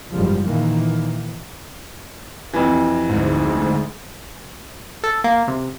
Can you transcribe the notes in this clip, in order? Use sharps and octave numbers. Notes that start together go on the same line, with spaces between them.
F#1 G#2 F3 G3
A#2 D#3 E3 A#3
F2 C3 E3
D2 G#2
A4
A#3
C3